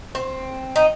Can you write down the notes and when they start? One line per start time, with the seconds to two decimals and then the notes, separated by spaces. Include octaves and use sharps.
0.15 C4
0.76 D#4